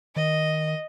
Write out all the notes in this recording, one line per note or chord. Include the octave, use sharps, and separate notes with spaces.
D#3 D#5